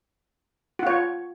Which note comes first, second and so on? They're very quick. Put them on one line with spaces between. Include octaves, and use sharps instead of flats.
F#4 F4 C#5